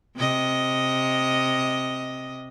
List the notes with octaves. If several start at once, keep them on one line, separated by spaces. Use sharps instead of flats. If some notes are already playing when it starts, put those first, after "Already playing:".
C3 D#5